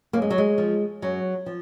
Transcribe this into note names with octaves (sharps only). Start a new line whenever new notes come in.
F#2 A#3
G#3
F#3
G#3
F3
F#2 F#3
F3